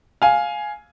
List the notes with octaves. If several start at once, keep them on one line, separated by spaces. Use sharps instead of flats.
F5 G#5